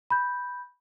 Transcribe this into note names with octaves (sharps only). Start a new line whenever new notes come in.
B5 G6